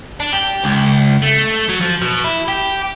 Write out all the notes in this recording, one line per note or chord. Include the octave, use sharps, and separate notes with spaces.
D4
G4
C#2
A3
F#3
F3
B2
E4
G4